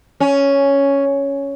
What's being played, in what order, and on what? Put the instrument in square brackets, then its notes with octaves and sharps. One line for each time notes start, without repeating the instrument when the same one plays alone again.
[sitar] C#4